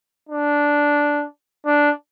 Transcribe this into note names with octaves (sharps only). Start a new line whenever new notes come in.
D4
D4